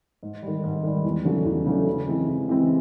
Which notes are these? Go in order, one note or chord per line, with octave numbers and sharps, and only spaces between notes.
G#2
G3
D#3
G#2
D#3 G3
E2
C#3 F#3 A3 D4
E2
C#3 F#3 A3 D4
C#3
E3 G#3 C4
C#3
E3 G#3 C4